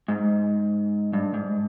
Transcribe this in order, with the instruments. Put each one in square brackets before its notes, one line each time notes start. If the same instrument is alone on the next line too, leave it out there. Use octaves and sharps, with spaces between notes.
[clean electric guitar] G#2
G2
G#2